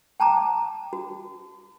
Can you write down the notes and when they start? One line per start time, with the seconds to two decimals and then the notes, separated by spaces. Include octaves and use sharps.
0.20 G5 A5 A#5 D6
0.93 F#4